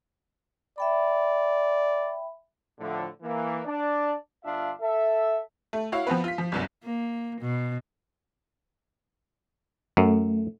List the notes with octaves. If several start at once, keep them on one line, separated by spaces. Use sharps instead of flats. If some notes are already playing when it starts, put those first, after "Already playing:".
D5 E5 G5 B5
A2 D3 F3
E3 A#3
D4 D5
G1 D4 F4 E5 F5
A4 E5
A3
E4 F#4 C#5 F5
F3 B3 C4 B4
F4 B6
F3
G1 C2 F#2
A#3
B2
F#2 A3